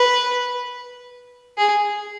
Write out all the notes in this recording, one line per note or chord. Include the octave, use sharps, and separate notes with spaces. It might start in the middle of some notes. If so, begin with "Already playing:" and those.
Already playing: B4
G#4